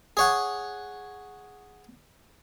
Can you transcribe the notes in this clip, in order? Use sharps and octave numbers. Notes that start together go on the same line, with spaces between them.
G#4 C#5 F#5